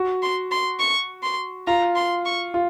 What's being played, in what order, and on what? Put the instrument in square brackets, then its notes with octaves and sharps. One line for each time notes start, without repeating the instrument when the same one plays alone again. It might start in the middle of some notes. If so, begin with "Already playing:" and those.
Already playing: [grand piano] F#4
[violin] C6
C6
C#6
C6
[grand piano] F4 [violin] A#5
[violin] C6
C#6
[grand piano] F4